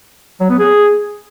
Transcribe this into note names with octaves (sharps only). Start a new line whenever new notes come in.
F#3
B3
G#4